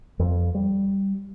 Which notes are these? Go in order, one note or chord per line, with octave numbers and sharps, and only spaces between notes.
F2
G3